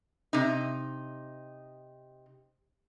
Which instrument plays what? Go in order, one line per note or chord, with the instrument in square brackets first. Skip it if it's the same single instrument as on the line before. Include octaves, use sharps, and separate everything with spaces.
[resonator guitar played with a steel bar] C3 D#4